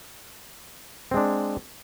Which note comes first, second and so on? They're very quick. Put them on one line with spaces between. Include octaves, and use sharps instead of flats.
C4 G#3 D4